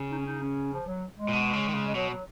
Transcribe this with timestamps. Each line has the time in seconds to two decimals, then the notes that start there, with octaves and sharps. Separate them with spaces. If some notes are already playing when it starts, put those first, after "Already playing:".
Already playing: C#3
0.10 D#4
0.18 C#4
0.25 D#4
0.41 C#4
0.72 F3
0.86 F#3
1.18 G#3
1.28 A#2
1.33 B2
1.53 C#3
1.68 D#3
1.74 C#3
1.86 G#3
1.94 B2 F#3
2.09 F#3